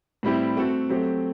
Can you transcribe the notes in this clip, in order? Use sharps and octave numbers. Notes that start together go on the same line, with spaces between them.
A2 G3 C4 E4 G4
A3 C4 F#4 A4
F#3 A3 C4 G4 C5